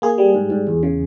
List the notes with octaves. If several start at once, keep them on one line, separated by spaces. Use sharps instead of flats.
A#3 G#4
G3
G#2
G#2
E2
C#3